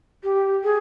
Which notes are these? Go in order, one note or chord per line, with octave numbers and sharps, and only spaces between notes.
G4
G#4